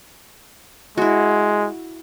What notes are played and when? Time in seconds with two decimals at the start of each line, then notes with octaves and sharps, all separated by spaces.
0.97 G#3 E4 F#4